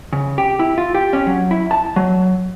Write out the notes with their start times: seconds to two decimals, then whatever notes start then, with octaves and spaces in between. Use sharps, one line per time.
0.13 C#3
0.38 G4
0.59 E4
0.78 F4
0.95 G4
1.13 C#4
1.26 F#3
1.51 E4
1.71 A5
1.96 F#3